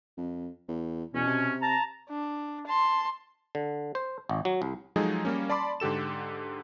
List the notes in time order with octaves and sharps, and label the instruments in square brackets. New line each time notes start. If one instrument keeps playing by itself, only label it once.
[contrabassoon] F2
E2
[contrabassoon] E2 [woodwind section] B2 C#4
[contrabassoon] C3
[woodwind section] A5 A#5
[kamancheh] D4
A5 C6
[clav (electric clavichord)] D3
C5
G#1
F#3
C2
[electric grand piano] F3 F#3 G#3 D#4 G#4 A4
G3 A#3 C#4
D5 A5 B5 C6 D6
G#2 D3 G4 A4 E7